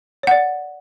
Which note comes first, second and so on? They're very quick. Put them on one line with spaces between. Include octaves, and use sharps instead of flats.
C#5 F#5 D5